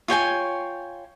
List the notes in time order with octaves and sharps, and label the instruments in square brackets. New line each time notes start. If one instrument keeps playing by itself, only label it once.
[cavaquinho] F4 C#5 G5 G#5